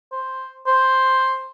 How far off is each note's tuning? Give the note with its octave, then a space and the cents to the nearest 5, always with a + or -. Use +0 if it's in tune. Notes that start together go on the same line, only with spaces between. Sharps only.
C5 +5
C5 +5